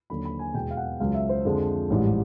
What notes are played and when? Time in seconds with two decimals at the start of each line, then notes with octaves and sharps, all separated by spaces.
0.10 D#2 D3 F#3 B5
0.25 B5
0.39 G#5
0.54 E2 B2 G#3 G5
0.71 F5
0.77 F#5
1.00 C#2 C#3 F#3 F5
1.14 E5
1.29 C5
1.45 F2 D3 F3 G#3
1.90 A1 G#2 E3 G3